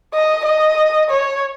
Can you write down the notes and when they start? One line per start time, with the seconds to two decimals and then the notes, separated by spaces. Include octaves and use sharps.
0.14 D#5
0.45 D#5
1.10 C#5